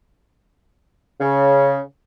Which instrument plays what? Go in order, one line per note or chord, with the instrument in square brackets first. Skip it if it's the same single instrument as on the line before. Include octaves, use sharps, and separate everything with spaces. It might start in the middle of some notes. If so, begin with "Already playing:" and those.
[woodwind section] C#3